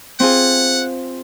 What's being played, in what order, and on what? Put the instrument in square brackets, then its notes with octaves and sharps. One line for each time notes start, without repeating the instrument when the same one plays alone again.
[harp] C4 F4 G#4 [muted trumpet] F#5